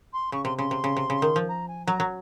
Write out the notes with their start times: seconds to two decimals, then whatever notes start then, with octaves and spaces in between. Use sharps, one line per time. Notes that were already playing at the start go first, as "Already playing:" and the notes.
0.13 C6
0.32 C#3 C#6
0.45 C3 C6
0.58 C#3 C6
0.71 C3
0.84 C#3
0.97 C3
1.10 C#3
1.22 D#3
1.36 F3
1.48 A#5
1.68 G#5
1.86 F#3 A#5
2.00 F#3